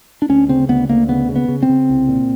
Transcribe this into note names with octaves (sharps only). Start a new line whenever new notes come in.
D4
D2 C#4
C#3 C4
D2 B3
D2 A#3
C#3 B3
C#3
B3
C#3
C4
C#3
C2
A#2